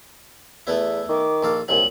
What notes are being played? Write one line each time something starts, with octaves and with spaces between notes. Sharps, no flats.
E2 A3 B3 E4
D#3 D6
A#1 A4 F5
C2 A#2 F#3 F#7